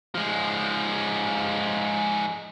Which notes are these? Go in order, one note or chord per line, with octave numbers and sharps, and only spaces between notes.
F3 G#3